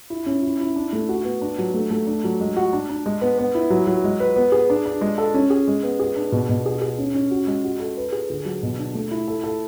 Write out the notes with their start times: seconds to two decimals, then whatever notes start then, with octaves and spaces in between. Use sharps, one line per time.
0.10 E4
0.26 C#4
0.43 E4
0.60 E4
0.76 D4
0.93 A3
1.09 F#4
1.25 B3
1.42 D4
1.59 F#3
1.74 A3
1.91 A3
2.07 D4
2.24 F#3
2.40 G#3
2.57 F#4
2.73 D4
2.90 D4
3.06 G#3
3.21 B3
3.39 B3
3.55 E4
3.70 F#3
3.87 F#3
4.04 G#3
4.20 B4
4.36 B3
4.52 G#4
4.70 D4
4.86 D4
5.01 G#3
5.18 A4
5.34 C#4
5.50 G#4
5.68 G#3
5.83 B3
6.00 G#4
6.16 D4
6.32 B2
6.49 B2
6.66 G#4
6.82 G#4
6.99 C#4
7.14 C#4
7.31 F#4
7.47 G#3
7.64 F#4
7.80 A4
7.97 B4
8.12 G#4
8.30 D3
8.45 F#3
8.63 B2
8.79 D4
8.95 A3
9.11 E4
9.28 A4
9.44 A4